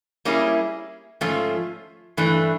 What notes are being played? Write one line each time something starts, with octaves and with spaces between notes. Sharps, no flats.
G3 A#3 C#4 E4 G#4
G#2 F3 A3 C#4 F4
G2 E3 A3 D4